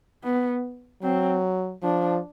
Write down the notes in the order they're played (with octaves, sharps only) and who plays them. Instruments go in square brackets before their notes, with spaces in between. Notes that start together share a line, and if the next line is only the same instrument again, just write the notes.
[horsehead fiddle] B3
[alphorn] F#3 [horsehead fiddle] C4
[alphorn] F3 [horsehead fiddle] D4